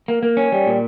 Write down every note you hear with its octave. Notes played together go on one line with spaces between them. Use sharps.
A#3
A#3
C#4
G3
A#2